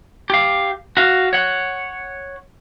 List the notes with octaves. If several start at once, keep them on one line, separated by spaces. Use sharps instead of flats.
G4 F5
F#4 F5
C#5 F#5